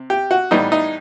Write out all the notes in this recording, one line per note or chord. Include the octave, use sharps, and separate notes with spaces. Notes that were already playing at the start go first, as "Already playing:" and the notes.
Already playing: C3
G4
F#4
A2 E3 G3 B3 D#4
D#4